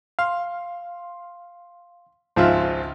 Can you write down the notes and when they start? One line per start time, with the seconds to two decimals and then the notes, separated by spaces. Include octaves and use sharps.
0.19 F5 C6
2.36 G#1 C#2 F3 F4 C5 E5 F5 F#6